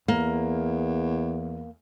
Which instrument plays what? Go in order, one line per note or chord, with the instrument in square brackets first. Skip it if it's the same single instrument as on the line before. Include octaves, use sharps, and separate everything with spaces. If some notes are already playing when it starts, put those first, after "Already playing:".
[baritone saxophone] E2 [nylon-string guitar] A#3